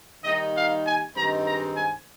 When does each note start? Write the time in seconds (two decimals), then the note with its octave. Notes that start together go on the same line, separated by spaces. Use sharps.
0.24 D#3 G3 A#3 D#4 D#5
0.54 F5
0.85 G#5
1.14 G2 D#3 G#3 C4 D#4 A#5
1.45 A#5
1.75 G#5